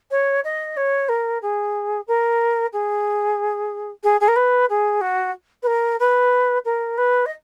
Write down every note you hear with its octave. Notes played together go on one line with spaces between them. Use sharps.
C#5
D#5
C#5
A#4
G#4
A#4
G#4
G#4
G#4
A#4
B4
G#4
F#4
B4
A#4
B4
A#4
B4
D#5